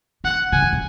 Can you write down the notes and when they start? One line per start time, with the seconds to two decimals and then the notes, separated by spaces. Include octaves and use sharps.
0.24 A#2 F#5
0.52 C#3 G#5
0.62 A#2
0.73 B2